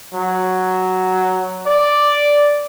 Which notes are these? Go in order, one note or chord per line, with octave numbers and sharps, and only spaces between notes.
F#3
D5